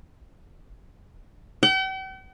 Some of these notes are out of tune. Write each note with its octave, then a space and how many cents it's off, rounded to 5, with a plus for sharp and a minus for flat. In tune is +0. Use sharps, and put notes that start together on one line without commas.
G5 -45